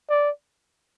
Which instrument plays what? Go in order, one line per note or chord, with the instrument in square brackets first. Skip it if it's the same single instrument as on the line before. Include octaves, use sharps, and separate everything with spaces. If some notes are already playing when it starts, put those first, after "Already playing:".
[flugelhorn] D5